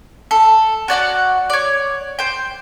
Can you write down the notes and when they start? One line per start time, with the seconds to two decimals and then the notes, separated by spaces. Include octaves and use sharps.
0.31 A4
0.88 F#4 D5 F#5 A#5
1.50 C#5 D5
2.19 C5 G5